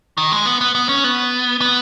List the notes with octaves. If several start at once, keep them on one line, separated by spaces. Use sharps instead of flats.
D#3
G#3
B3
B3
B3
C#4
B3
B3